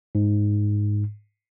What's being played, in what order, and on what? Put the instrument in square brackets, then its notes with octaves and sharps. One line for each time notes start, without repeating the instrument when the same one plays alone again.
[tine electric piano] G#2